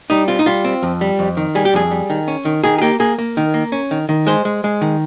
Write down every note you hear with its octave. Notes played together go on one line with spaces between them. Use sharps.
G3 D#4
C4 F4
D#4
G3 F4
C4
F2
G3
F2
D#3
G3 G#4
G4
F2 G#4
G3
D#3
C#4
D#3
D#3 G#4
G#4
A#3 G4
A#3 G#4
A#3
D#3
A#3
C#4
D#3
D#3
G#3 C5
G#3
G#3
D#3